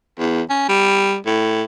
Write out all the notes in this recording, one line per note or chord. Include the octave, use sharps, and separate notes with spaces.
E2
C#4
G3
A2